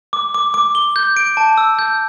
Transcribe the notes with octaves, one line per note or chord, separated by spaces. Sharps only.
D6
D6
D6
G7
G6
D7
A5
E6
G6